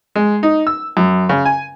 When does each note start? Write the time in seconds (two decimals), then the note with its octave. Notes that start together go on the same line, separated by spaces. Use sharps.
0.16 G#3
0.43 D#4
0.67 E6
0.97 F#2
1.29 C#3
1.45 G#5